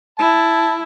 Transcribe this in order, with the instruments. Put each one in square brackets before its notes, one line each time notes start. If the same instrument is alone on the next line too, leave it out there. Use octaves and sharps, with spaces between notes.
[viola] E4 [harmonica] A5